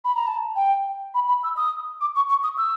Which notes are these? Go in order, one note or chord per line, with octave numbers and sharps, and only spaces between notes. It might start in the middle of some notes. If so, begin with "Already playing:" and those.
B5
A#5
A5
G5
B5
B5
E6
D#6
D6
C#6
C#6
D#6
E6